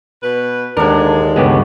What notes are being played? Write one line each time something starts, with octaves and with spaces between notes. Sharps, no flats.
B2 B4
D#2 D3 G#3 D4 A#4
C#2 G2 C#3 G#3 B3 G4